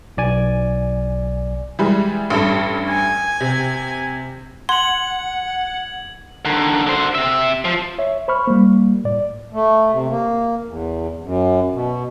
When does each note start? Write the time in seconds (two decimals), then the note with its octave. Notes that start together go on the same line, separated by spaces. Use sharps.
0.17 B1 D5 G#5
1.79 E3 G3 G#3
2.30 A1 G2 A4
2.90 G#5
3.40 C3
4.69 F#5 C6 G#6 F#7
6.45 D3 D#3
6.87 D3 C5
7.15 C3 E5
7.65 F3
7.99 C#5 E5
8.28 C5 B5 C#6 F6
8.47 G3 A#3
9.04 A2 D5
9.53 A3
9.91 C3
10.10 A#3
10.66 E2
11.22 F#2
11.73 B2